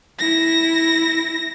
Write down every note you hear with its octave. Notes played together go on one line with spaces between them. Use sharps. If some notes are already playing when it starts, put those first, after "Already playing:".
E4 A#6